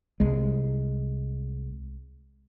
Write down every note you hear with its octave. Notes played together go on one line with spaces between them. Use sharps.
C2 G#3